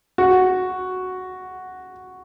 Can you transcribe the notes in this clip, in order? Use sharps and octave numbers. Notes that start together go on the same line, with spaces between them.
F#4